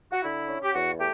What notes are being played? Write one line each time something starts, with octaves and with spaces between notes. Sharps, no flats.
F#4
D3 E4
C#4
G4
E2 F#4
A3 G4